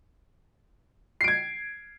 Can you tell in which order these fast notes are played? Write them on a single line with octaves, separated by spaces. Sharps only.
C7 D7 G#6